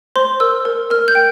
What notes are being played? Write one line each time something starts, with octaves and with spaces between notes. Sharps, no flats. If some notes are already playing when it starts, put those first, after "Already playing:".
C5 C6
A#4 E6
A#4
A#4 F6
G6
G5